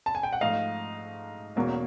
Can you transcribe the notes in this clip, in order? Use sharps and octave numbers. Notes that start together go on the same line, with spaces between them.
A5
G#5
G5
F#5
G#2 F3 A3 D#5 F5
E2 B2 F#3 A#3 C#4